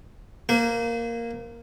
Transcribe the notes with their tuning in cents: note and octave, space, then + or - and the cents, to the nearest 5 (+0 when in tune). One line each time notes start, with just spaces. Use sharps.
A#3 +0 C5 -40